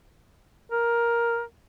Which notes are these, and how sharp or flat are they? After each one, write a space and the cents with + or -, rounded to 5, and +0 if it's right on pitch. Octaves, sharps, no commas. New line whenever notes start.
A#4 +10